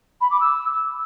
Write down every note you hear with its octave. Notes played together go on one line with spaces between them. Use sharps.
B5
D6
E6